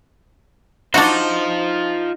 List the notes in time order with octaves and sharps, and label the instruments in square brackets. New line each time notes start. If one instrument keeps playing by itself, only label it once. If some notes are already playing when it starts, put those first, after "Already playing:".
[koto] D4 F#4 [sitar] D#4 [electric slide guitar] F4 C5